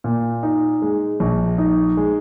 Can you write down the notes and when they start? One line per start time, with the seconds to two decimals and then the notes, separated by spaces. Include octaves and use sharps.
0.04 A#2
0.43 D#4
0.82 G#3
1.20 A#1
1.58 D#4
1.97 G#3